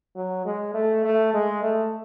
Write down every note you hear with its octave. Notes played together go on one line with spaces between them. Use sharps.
F#3
G#3
A3
A3
G#3
A3